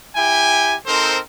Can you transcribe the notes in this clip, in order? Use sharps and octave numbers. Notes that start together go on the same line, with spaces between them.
E4 G4 G5 G#5
C4 D#4 A4 A#4 C5